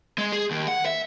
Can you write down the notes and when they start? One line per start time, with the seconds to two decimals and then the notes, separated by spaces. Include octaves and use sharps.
0.18 G#3
0.32 G#4
0.51 D#2
0.68 F#5
0.86 E5